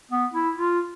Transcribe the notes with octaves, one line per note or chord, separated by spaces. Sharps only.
B3
E4
F4